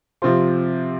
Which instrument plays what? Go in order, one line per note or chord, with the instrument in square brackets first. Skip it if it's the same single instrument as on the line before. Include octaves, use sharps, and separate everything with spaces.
[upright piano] C3 F3 C4 F4 C5